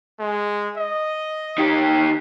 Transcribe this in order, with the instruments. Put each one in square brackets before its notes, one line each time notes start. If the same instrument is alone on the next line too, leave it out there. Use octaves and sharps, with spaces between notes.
[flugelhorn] G#3
D#5
[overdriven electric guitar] D#3 G4